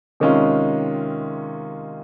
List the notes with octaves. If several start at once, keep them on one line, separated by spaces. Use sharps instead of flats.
C3 D#3 G#3 C#4 F4